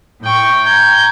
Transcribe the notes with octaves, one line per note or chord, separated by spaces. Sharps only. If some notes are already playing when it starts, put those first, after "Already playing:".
A2 G5 C#6
A#5 G6 G#6